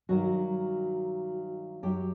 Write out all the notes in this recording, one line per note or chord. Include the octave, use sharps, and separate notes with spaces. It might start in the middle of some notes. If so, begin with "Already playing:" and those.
G2 D#3 F#3 F#4
F#2 F#3 G4